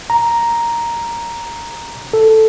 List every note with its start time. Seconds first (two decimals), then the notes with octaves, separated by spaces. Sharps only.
0.10 A#5
2.13 A4